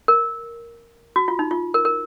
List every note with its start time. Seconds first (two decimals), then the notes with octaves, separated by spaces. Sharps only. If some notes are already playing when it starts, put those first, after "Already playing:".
0.08 A#4
1.16 F#4
1.28 F4
1.39 D#4
1.51 F4
1.74 A#4
1.85 A#4